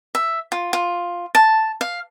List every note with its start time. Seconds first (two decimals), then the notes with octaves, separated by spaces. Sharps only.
0.15 E5
0.52 F4
0.73 F4
1.35 A5
1.81 F5